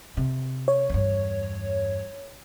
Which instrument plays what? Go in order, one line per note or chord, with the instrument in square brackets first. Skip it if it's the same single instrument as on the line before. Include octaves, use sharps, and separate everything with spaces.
[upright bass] C3
[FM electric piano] C#5
[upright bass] E2 G2